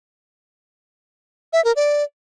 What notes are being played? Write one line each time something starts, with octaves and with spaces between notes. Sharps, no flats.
E5
A#4
D5